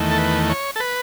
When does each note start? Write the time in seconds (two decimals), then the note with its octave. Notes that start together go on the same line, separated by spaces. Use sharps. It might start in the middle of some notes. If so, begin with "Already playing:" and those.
Already playing: E2 D#3 A3
0.11 A4
0.18 B4
0.49 C#5
0.76 A4
0.80 B4